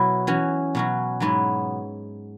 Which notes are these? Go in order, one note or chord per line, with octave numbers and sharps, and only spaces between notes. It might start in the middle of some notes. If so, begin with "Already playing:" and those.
Already playing: B2 F#3 E4
E3 C#4 F#4
B2 F#3 C#4 F#4
G#2 F#3 B3 E4